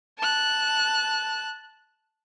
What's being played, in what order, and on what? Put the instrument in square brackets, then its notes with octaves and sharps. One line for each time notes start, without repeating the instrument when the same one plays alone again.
[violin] A5 F#6